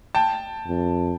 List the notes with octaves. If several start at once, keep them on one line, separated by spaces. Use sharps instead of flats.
G5 A5
F2